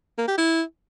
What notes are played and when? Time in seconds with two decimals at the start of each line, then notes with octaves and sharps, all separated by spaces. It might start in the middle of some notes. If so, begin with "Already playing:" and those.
0.18 A#3
0.28 G4
0.38 E4